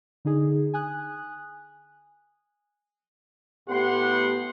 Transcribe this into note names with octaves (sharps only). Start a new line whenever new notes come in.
D3 D#4 G#4
G#5 D#6 F#6
A2 B3 G4 F#5 C6